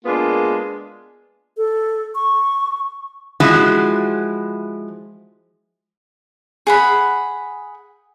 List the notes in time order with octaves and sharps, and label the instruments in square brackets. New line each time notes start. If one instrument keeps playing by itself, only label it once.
[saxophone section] G#3 A#3 B3 D4 F4
[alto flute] A4
C#6
[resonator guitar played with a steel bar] E3 F3 G#3 E4 F#4
[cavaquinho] G#4 F#5 B5